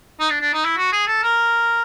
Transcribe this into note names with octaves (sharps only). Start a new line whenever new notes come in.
D#4
D4
D4
D#4
E4
F#4
G#4
A4
A#4